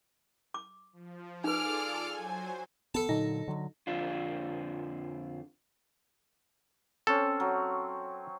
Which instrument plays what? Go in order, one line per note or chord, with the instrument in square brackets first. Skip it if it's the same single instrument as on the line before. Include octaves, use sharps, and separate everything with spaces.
[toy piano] D6
[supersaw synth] F3
[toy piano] D#4 B4 [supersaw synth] F4 A4 D5 [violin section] G#4 D6 F6
[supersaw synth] F#3 C5 [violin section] G#5
[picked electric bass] B3 [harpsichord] A4 A5
[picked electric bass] A#2 D3 F#3 [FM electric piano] D#4
[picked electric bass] D3 F#3
[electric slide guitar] F2 D3 D4 F4
[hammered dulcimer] C4 C#4 [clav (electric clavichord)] A4
[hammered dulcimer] F#3